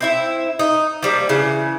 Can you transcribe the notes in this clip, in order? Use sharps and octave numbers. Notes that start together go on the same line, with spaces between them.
C4 E4 E5
D#4
F3 G3 A#3
C#3 E3